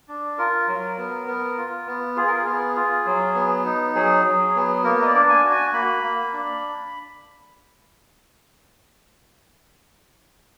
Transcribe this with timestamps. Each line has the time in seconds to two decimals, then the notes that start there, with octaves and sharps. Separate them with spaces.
0.08 D4
0.38 F4 A#4
0.68 F#3
0.98 B3
1.27 B3
1.57 F4
1.87 B3
2.16 F4 G#4
2.27 A#4
2.37 G#4
2.46 B3
2.76 F4
3.06 F#3
3.35 B3
3.66 D#4
3.95 F#3 G#4
4.25 F#3
4.55 B3
4.84 A#3 A#4
5.02 D#5
5.06 D5
5.14 D4
5.29 G#5
5.44 F#4
5.51 G#5
5.73 A#3 B5
6.04 A#3
6.33 D4